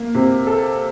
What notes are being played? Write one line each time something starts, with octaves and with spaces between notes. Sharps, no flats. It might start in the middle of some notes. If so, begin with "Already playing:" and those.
Already playing: A#3
C3
A4